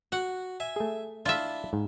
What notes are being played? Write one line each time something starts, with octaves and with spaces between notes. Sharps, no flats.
F#4 F#5
E5 G#5
A3 G#4
D4 E4 F4 E5
G#2